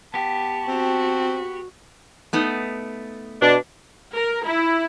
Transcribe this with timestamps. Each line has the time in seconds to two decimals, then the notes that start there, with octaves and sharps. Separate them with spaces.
0.14 B3 G4 A5
0.68 C4 F#4
2.33 A3 B3 D#4
3.42 B2 D4
4.13 A#4
4.44 E4